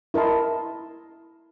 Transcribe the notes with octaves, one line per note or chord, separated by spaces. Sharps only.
E4 A#4 D#5 A5 C6